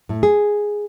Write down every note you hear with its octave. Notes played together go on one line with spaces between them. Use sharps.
A2
G#4